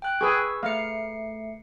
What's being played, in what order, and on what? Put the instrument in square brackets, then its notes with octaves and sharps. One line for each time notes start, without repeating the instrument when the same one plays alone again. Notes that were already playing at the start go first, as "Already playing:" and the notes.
[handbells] G5 F#6
[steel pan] G#4 B4 [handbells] C#6 E6
[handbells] A3 C7 C#7 [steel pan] F5